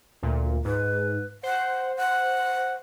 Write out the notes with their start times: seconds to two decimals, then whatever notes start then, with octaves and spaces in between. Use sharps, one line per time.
0.22 D2 A#2
0.65 G#2 B4
1.43 C5 F#5
1.96 F#5